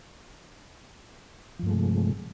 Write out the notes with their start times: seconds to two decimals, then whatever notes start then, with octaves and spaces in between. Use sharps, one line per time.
1.59 F3
1.63 G2
1.66 A3
1.70 G#3
1.73 C3